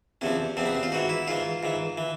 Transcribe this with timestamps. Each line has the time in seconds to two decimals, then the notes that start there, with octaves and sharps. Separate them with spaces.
0.21 E2 C3 F3 C#4
0.57 E2 C3 F3 C4
0.65 B3
0.75 C4
0.83 F4
0.92 G#2 E3 F#4
1.09 E4
1.28 G#2 E3 F4
1.63 G#2 E3
1.98 E3